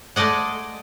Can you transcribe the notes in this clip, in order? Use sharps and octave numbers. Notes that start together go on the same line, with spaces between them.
G#3 A3 D5 D#5 F#5